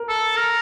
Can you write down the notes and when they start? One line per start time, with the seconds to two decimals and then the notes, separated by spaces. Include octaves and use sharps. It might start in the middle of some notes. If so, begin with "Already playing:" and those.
Already playing: A#4
0.09 A4
0.36 A#4